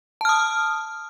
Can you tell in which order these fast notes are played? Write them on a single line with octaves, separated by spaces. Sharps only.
A5 F6 D#6